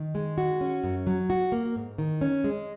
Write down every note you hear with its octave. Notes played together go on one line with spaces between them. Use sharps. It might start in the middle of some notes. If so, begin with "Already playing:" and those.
Already playing: D#3
G#3
F#4
C#4
F#2
F#3
F#4
A#3
G#2
D#3
C#4
G#3